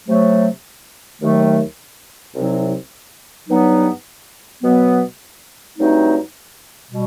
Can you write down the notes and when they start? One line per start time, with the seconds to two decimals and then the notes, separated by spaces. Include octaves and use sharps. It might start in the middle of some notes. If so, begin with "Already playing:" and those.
0.07 C3 F#3 A3
1.21 D#2 D#3 F#3 A3
2.35 C2 C3 F#3 C4 D#4
3.49 G2 F#3 B3 D#4
4.62 B2 F#3 B3
5.77 G2 F#3 A3 C4 D#4
6.91 B2 G3